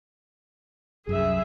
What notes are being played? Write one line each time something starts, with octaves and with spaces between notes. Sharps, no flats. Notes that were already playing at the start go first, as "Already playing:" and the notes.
C2 F#2 G#4 E5